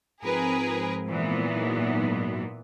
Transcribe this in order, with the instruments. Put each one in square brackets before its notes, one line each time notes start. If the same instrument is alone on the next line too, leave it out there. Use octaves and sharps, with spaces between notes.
[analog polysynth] G#2 F3 C4 [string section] G#4 A#4 B4
[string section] A#2 E3 B3
[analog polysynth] G#2 F#3 D#4